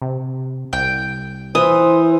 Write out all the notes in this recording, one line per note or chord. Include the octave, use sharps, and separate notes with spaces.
C3
C2 G5
E3 C5 D#6